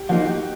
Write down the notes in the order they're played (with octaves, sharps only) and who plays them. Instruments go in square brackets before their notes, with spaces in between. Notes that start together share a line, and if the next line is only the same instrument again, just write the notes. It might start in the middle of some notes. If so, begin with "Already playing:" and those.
Already playing: [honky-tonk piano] G4
[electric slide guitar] F3 A#3 D#4 [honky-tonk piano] F#4
[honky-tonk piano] G4